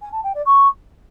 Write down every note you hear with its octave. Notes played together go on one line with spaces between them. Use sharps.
G#5
A5
G5
D5
C#6